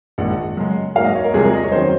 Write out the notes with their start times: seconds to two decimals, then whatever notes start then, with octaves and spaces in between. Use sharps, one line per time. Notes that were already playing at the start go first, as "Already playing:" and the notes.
0.18 A#1 G#2 D#3 F#5
0.57 F#2 C#3 G#3
0.96 G#2 F#3 A#3 F5
1.04 D#5
1.15 C#5
1.24 A#4
1.34 C2 C3 F3 G#3 G#4
1.44 A#4
1.54 D#5
1.63 C#5
1.72 F#2 D#3 F#3 C4 C5